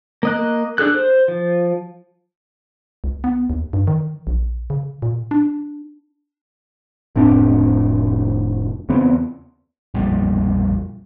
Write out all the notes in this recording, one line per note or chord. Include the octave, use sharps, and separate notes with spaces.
A#3 D#5 F#6
D4 G#4 A4 F#6
C5
F3
C#2
B3
D#2
G2
D#3
A#1
C#3
A#2
D4
F1 A2 C4 D4
E2 C#3 B3 C4
A#1 F2 G3 A#3